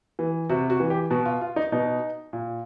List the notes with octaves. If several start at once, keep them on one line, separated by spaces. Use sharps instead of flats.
E3
C3 F#4
F#4
E3
G4
B2 F#4
F4
F4
D#4
B2 D#4
A#2